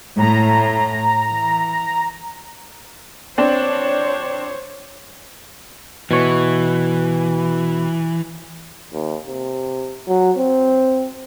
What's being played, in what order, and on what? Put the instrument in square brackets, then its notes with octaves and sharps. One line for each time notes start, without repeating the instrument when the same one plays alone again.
[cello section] A2 [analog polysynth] A#5
[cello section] E3
[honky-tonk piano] C4 D4 [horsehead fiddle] C5 C#5
[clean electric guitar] B2 C#5 [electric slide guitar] E3
[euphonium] D#2
C3
F#3
C4